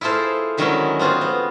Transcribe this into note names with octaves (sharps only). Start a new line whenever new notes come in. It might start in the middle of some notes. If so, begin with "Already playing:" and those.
E4 F4 G#4 A4 C5 F5
D3 D#3 F#3 G#3 C#4 E4
B3 C4 F4 F#4 G#4
B3